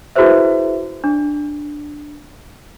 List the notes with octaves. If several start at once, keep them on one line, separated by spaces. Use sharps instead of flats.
E4 F#4 G#4 B4 C5 E5
D4